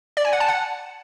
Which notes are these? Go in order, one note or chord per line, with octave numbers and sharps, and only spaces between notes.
D5
G#5
F#5
A5
F#5